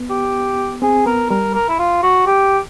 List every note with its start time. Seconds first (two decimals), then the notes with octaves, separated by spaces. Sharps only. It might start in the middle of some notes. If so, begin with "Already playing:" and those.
Already playing: B3
0.10 G4
0.82 C4 G#4
1.06 B3 A#4
1.30 G3 A#4
1.54 A#4
1.69 E4
1.79 F4
2.03 F#4
2.26 G4